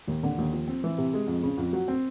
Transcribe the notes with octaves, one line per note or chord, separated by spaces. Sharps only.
D#2
D3
D#2
F3
C4
E3
C3
G#3
F2
C#3
F2
F#3
C4